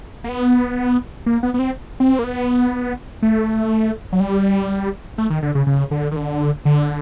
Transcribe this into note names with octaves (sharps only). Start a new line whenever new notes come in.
A#3
B3
A#3
B3
B3
C4
C4
A#3
B3
A3
F#3
G3
A3
D#3
D3
C#3
C#3
D3
D#3
D3
D3